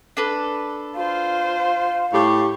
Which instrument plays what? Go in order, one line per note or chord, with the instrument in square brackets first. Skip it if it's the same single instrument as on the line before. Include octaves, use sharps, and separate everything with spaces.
[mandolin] D4 A4 B4
[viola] F4 C5 [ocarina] F5
[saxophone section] A2 G4 [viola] C#6